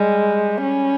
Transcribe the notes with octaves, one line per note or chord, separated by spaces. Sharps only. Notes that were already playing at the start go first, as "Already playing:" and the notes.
Already playing: G3 G#3
C#4